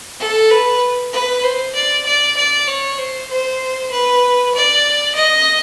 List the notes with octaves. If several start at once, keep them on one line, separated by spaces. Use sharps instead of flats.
A4
B4
B4
C5
D5
D5
D5
C#5
C5
C5
B4
D5
D#5